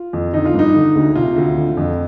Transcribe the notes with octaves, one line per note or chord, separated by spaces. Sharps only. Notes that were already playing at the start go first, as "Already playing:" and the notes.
Already playing: F4
F2
D3 D#4
F4
G2 D#4
D3
D2
C3 F4
D2
D3
F2